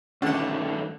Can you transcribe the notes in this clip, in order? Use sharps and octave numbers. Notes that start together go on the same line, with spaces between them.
G2 D3 D#3 A3 C#4 D4 F#5